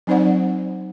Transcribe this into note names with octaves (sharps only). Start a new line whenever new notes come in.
F#3 C4 D#4 C5 D5 F#5